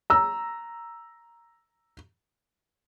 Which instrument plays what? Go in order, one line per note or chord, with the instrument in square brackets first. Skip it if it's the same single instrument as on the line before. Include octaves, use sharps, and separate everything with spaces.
[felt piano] A#5 E6